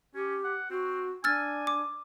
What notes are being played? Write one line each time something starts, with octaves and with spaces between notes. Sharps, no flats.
C#4 G4
F#5
C4 F#4
D4 G#5 E6 F6 A6
D6